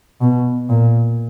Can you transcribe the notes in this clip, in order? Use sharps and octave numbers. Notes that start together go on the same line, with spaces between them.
B2
A#2